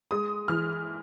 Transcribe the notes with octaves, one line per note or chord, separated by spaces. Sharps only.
G#3 D#6
E3 F6